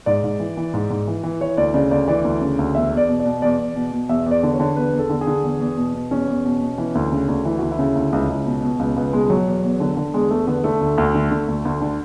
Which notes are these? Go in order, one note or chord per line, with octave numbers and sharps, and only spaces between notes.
G#2 D5
G#2
E3
E3
G#2
G#2
E3
E3
E3 C#5
D2 D5
C#3 D5
D2 D5
E3 D5
D2
C#3
D2
E2 E5
E2
D5
B2
D5
B2
E2 D5
E2
B2
B2
E2 E5
E2
D5
D3
C#5
D3
E2 B4
E2
A4
D3
G#4
D3
E2
E2
B2
B2
E2 C#4
E2
B2
B2
E3
D2
C#3
D2
E3 E4
D2 F#4
E4
C#3
D2
C#2
C#2
B2
B2
C#2
C#2 B3
B2 G#3
G#3
B2 F#3
E2
E2
D3
D3
E2 G#3
E2 A3
D3 B3
D3 A3
D2
D2
D3
D3
D2
D2
D3